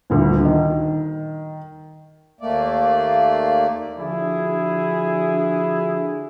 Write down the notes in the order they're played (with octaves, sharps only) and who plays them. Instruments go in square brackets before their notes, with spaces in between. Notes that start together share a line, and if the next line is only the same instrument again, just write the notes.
[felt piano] D#1 D2
D#3
[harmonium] D#2 A3 A#3 D5
[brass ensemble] D3 F3 D4 E4 F#4 G#4